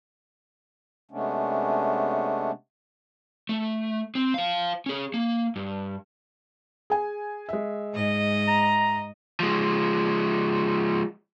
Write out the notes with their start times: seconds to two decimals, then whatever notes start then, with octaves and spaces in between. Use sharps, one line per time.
1.11 C3 G#3 A3 B3 C#4 D4
3.49 A3
4.15 C4
4.34 C5 F5
4.86 C#4 G#4
5.14 A#3
5.56 G2
6.90 G#4 G#5
7.49 G#3 E5
7.94 G#2 D#5
8.48 A#5
9.40 F3 G#3